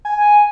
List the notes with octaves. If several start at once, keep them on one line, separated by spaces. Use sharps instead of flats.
G#5